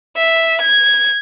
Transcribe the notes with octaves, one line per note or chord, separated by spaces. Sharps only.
E5
G#6